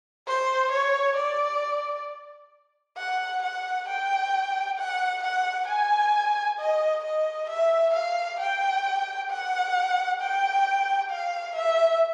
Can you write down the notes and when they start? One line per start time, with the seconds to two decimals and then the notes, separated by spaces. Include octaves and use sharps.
0.27 C5
0.72 C#5
1.17 D5
2.97 F#5
3.43 F#5
3.89 G5
4.78 F#5
5.24 F#5
5.68 G#5
6.59 D#5
7.04 D#5
7.50 E5
7.94 F5
8.40 G5
9.30 F#5
10.20 G5
11.11 F5
11.55 E5